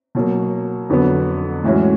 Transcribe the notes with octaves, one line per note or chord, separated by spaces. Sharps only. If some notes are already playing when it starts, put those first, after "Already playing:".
B2 F#3 A#3
F2 D3 F#3 B3
A2 E3 G#3 C#4 F#4